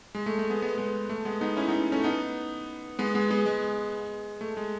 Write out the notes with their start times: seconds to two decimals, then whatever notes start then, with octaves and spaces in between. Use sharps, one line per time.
0.15 G#3
0.26 A3
0.39 A3
0.50 G#3 B3
0.62 G#3 B3
0.78 G#3 B3
1.09 A3
1.25 G#3 B3
1.41 B3 D#4
1.57 C#4 E4
1.68 B3 D#4
1.92 A3 C#4
2.04 B3 D#4
2.99 G#3 B3
3.15 G#3 B3
3.30 G#3 B3
3.46 G#3
4.41 A3
4.57 G#3